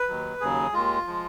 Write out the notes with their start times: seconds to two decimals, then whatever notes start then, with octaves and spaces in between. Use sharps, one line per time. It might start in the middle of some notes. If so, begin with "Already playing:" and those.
Already playing: B4
0.08 D#2 D#3 F#3
0.40 D#2 C#3 F#3 G#4
0.73 D#2 D#3 G#3 F4
1.07 F3 G#3